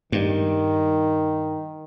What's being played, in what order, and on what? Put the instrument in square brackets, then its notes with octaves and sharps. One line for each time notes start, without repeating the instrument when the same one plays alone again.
[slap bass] G2 [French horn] D#3